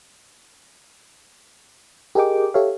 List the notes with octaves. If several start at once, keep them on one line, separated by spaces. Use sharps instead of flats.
G4 G#4 A#4 D#5 G5 D6
G4 A4 C#5 E5 F5